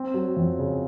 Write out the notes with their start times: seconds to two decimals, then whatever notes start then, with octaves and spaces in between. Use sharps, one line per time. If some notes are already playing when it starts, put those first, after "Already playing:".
Already playing: C4
0.14 F#3
0.37 F2
0.59 C#3